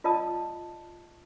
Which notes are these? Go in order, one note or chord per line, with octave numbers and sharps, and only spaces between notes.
F4 D5 D#5 A5 D#6